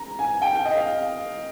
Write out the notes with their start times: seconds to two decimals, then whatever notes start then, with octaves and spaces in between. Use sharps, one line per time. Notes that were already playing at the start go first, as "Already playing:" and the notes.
Already playing: A#5
0.19 G#5
0.42 G5
0.65 D#5
0.75 F5